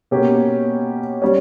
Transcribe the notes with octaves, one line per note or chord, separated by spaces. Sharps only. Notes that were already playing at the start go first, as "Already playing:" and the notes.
B2 A#3 C#4 G4
G3 C#4